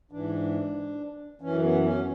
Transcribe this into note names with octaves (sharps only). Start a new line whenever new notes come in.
G#2 E3 D4
F#2 E3 C#4
B3
C#4